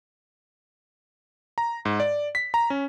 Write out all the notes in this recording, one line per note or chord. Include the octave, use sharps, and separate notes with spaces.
A#5
G#2
D5
B6
A#5
C#4